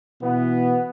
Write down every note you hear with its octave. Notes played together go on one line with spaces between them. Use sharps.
B2 E3 B3